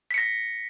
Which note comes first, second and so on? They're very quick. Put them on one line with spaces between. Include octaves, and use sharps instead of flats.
B6 C#7 A#6